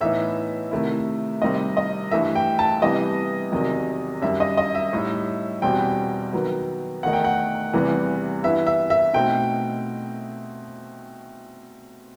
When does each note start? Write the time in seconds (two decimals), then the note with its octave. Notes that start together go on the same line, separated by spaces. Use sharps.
0.01 A2 E3 B3 D#4 E5
0.71 C3 D#3 A3 E4
1.41 C3 D#3 G3 C4 D#5
1.77 D#5
2.11 G2 E3 A3 E5
2.35 G5
2.59 A5
2.82 C3 E3 G3 B3 D#5
3.52 E2 C3 D#3 F#3
4.22 F#2 D#3 G3 E5
4.40 D#5
4.57 D#5
4.75 E5
4.93 A2 G3 D#4
5.62 E2 B2 G3 C4 G5
6.33 D#3 F#3 B3
7.03 E2 D#3 A3 D#4 F#5
7.13 G5
7.24 F#5
7.73 E2 C3 E3 G3 B3
8.43 G2 E3 B3 E4 E5
8.66 E5
8.90 E5
9.14 B2 A3 C4 D#4 G5